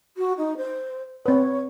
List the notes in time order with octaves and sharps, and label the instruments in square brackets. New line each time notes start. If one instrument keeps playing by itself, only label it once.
[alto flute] F#4
D#4
C5
[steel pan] C4 B4 [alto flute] C#5